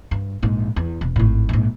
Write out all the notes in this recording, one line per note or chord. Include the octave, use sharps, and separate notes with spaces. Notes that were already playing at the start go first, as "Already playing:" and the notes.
G2
A#1 G#2
E2
E1
G#1 A2
A#1 G#2